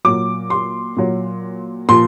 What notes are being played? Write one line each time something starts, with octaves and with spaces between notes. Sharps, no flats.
A#2 F#3 D6
C6
A#2 F#3
A#2 F3 C6